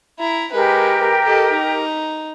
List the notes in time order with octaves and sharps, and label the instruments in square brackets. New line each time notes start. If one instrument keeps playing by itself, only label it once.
[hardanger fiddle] E4 A#5
[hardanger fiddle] G#3 B4 [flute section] G4 A#4
[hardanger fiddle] A4 D#5
D#4 A#5